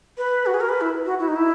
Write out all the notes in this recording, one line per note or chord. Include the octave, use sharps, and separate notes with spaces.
B4
F#4
G#4
A#4
B4
E4
F#4
E4
D#4
E4